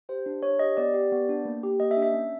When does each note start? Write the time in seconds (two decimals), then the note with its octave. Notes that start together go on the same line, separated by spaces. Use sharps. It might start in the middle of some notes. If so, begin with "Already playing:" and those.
0.09 G4 C5
0.26 D4
0.43 D4 C#5
0.59 G4 D#5
0.77 B3 D5
0.94 G4
1.12 B3
1.29 D4
1.45 A#3
1.63 G4
1.80 A#3 D#5
1.91 E5
1.97 D4
2.02 E5
2.14 C#4